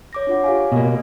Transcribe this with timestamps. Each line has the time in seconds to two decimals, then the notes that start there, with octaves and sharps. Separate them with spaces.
0.13 C#5 D6 A#6
0.27 D4 F4 F#5
0.44 G4 F5 G#5
0.72 B2 A#3 D#5